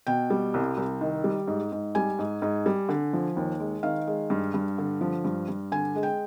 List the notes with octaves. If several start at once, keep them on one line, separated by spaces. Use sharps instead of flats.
B2 G5
G3
C2
C2
D#3
G3
G#2
G#2
G3 G#5
G#2
G#2
G3
D3
F3
D#2
G#3
D#3 F5
G#3
G2
G2
D3
F3
G2
G2
D3 G#5
G#3
G5